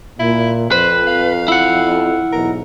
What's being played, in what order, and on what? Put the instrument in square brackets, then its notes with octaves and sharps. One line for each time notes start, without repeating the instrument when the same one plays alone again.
[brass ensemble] A#2 [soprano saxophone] E4
[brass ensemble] F2 [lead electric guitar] B4 [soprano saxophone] C5
[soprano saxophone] F5
[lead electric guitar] E4 F#5
[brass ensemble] B1 E2 G#2 [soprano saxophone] A#4